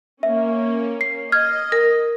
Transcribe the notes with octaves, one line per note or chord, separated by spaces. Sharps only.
A#3 C#4 E5
C7
D#5 F6 G#6
A#4